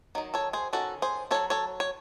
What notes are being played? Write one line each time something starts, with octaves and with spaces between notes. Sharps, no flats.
D#3 F#3 D#4
A4 C#5
G#4 C5
D#3 G#3 C#4 F#4 A4
G#4 C5
F#3 C#4 A4 C#5
A4 C#5
C#5